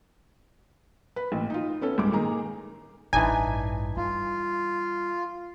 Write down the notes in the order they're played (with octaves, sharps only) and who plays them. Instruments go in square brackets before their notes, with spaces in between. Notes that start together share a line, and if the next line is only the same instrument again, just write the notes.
[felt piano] B4
A1 A#2
D#4 F4
B3 C#4 A4
C#2 G2 D6
A#2 D#3 G#4 A#5
[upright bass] A1 G2 [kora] E3 D4 D#4 [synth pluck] G#5
[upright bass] G3 [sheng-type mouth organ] F4